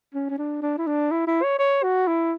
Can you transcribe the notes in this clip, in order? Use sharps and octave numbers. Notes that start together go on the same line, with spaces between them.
C#4
C#4
D4
D4
E4
D4
E4
E4
C#5
C#5
F#4
E4